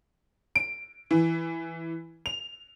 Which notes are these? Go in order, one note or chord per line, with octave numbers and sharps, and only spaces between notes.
D7
E3
F7